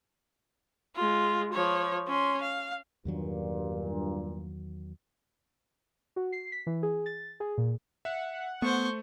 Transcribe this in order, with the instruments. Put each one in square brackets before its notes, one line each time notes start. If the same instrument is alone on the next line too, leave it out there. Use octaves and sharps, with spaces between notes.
[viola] G#3 F4
F3 C#5
C#4 C6
F5
[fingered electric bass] E2 D#3 F#3 [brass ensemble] G2 A#2
[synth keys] F#4
C7
B6
E3
G#4
A6
G#4
A#2
[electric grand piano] E5 [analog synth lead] F#5
[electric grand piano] A3 [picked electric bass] B3 [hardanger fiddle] C5 C#6